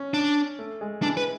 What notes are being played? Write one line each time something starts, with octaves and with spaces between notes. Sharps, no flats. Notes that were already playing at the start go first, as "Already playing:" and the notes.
Already playing: C#4
D4
A3
G#3
E3 D4
B4